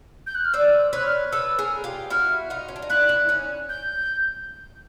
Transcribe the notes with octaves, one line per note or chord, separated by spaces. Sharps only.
G6
F#6
F6
C5 D5 E6
E6
B4 C#5 F#6
F6
A4 B4 E6
G#4 A#4
F4 G4
E4 F#4 F6
D#4 F4
C#4
D4
D#4
D4 E4 F#6
D4 E4
C#4 D#4
G6